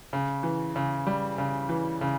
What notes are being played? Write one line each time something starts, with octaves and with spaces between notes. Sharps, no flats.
C#3
E3
C#3
G3
C#3
E3
C#3